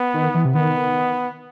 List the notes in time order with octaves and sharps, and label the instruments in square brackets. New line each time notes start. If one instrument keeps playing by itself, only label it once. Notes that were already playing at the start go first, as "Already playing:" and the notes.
Already playing: [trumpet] B3
[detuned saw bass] D#3
E3
C3
[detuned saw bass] D#3 [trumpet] B3